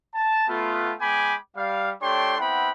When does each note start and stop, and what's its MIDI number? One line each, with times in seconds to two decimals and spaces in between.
0.15 0.46 81
0.48 0.93 57
0.48 0.93 59
0.48 0.93 65
1.00 1.35 56
1.00 1.35 59
1.00 1.35 79
1.00 1.35 80
1.00 1.35 83
1.00 1.35 86
1.55 1.91 55
1.55 1.91 77
2.01 2.37 57
2.01 2.37 62
2.01 2.37 67
2.01 2.37 73
2.01 2.37 79
2.01 2.37 84
2.38 2.70 59
2.38 2.70 60
2.38 2.70 64
2.38 2.70 78
2.38 2.70 79
2.38 2.70 83